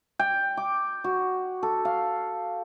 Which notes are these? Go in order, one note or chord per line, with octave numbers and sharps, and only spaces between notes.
G5
D6
F#4
A4
F5